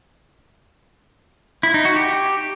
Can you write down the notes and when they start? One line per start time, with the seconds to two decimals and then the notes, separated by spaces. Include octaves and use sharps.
1.63 E4
1.74 D#4
1.85 F#4
1.96 G4